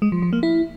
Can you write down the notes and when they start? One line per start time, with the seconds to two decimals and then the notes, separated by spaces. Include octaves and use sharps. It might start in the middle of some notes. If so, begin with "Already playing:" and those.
0.02 G#3
0.12 F3
0.22 F3
0.33 A#3
0.43 E4